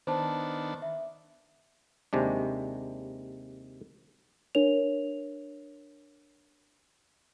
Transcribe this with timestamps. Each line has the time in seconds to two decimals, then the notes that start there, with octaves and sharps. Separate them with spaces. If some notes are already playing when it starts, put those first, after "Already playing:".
0.07 D#3 B3 D4 C5 A5
0.82 E5
2.13 D#2 C3 G#3 D4
4.55 D4 A#4 C#5 F7